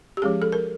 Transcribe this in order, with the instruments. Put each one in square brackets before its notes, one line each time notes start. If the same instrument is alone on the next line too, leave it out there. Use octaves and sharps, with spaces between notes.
[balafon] G4
F3 G#3 C#4 G#4
A4
A#4